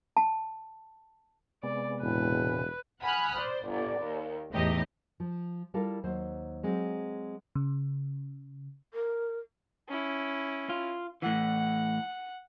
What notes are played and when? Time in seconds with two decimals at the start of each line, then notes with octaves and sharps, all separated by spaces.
0.17 A5
1.63 C3 G#3 B3 D5
2.01 E1 A2 B4
3.01 F#5 G#5 B5 D#6 F6 F#6
3.37 C5 D5
3.68 G1 D5
3.98 D#2
4.51 E2 A2 D#4 G4 D#5
5.20 F3
5.74 G3 E4 F4 A4 A#4 F5
6.04 D#2 F#3 C5
6.63 F#3 G#3 C4
7.55 C#3
8.93 A#4
9.88 C#4 E4
10.69 F4
11.22 A2 E3 F#5